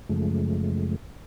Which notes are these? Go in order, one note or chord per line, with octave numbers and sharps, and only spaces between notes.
F#2 C#3 F3 G#3 A3